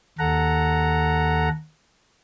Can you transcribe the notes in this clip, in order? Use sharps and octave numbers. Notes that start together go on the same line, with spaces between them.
D#2 A4 F#5 A#5